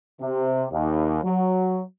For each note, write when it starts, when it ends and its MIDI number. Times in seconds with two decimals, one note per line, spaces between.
0.21 0.66 48
0.72 1.19 39
1.24 1.81 54